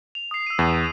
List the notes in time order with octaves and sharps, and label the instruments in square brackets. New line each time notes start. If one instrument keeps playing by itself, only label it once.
[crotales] F7
D#6 C7
E6 D#7
[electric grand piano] E2